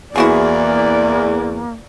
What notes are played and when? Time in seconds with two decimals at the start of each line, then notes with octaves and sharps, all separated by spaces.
0.16 E2 A#3 E4 F#4 G#4 D5